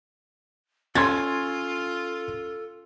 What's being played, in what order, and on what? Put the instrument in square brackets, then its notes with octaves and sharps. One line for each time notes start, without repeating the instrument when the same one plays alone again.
[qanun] C#4 [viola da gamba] F4 [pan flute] A4 [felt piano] C6 G#6 A6